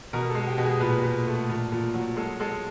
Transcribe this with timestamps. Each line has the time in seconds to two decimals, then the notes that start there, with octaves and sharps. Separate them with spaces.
0.13 B2 A#4
0.29 A4
0.35 G#3
0.47 G4
0.58 B2
0.64 G#4
0.80 A#2 B4
1.03 A#2
1.26 A3
1.49 A#2
1.72 A#2
1.94 F#3
2.16 G#3 A4
2.40 G#3 A4